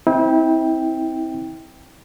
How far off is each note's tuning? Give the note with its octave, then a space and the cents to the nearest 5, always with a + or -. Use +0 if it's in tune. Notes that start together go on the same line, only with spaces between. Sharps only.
C4 +0 E4 -35 G5 +5